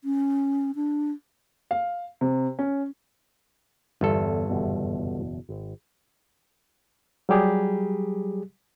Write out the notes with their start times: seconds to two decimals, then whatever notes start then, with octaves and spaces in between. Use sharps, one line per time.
0.04 C#4
0.75 D4
1.71 F5
2.21 C3
2.59 C#4
4.01 G1 E2 A4
4.49 F#1 E2 B2
5.49 G#1
7.29 F#3 G3 G4 G#4